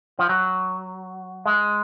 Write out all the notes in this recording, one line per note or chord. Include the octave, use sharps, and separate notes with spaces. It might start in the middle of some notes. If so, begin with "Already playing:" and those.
F3
F#3
G#3